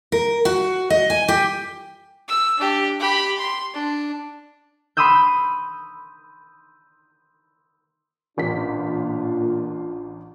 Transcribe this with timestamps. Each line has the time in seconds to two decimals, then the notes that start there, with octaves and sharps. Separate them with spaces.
0.12 A#4
0.45 F#4
0.90 D#5
1.10 G#5
1.28 G4
2.28 E6
2.58 D4 G4
3.00 G4 B5
3.39 C6
3.74 D4
4.97 B5 C6 D#6 E6 G6
8.38 A1 A#2 D4 F4 B6